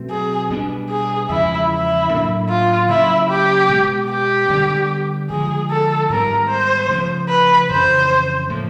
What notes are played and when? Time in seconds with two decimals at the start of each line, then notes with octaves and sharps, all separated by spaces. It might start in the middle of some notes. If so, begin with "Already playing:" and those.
Already playing: B2 F#3 A3 C4
0.10 G#4
0.50 B2 G3 B3 D4
0.89 G#4
1.29 E2 C#3 F3 G#3 E4
1.70 E4
2.10 A2 F#3 A#3 D4
2.49 F4
2.89 C#3 F#3 A#3 E4
3.29 G4
3.69 B2 G#3 B3
4.10 G4
4.50 D3 G3 B3
5.30 D3 F3 G#3 G#4
5.70 A4
6.09 G#2 D#3 G3 B3 A#4
6.49 C5
6.89 C#3 F3 A3
7.29 B4
7.69 F2 C#3 E3 C5
8.50 A2 F3 A#3